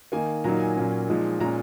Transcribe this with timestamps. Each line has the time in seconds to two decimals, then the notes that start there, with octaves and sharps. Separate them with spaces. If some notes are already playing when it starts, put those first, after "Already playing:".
0.12 D#3 A#3 D#4 G#5
0.44 A#2 F#3 A#3 D#4 A#5
0.60 G#5
0.76 A#2 F#3 A#3 C#4
1.08 A#2 F3 G#3 D#4
1.40 A#2 G#3 C#4 A#5